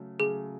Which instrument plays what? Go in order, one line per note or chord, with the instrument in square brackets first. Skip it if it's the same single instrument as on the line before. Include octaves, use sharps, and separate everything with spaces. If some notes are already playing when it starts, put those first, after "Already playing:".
Already playing: [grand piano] C#3 F#3 A3
[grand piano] C#3 F#3 A3 [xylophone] G#4